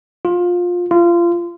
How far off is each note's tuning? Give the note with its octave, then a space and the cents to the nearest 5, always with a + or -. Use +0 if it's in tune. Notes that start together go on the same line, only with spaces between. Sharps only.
F4 +20
F4 -25